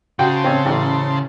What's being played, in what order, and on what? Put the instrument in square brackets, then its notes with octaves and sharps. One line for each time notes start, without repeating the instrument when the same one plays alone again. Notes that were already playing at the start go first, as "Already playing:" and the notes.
[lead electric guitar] C#3 [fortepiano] F#4 G5 [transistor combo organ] C5 A5
[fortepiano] C4 C#4
A1